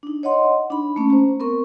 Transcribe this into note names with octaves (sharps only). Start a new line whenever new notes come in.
D4 D#4
C#5 D#5 F#5 C6
D4 D#4 B5
A3 A#3 C#4
C5 A#5
B3 C4 A#4 C#6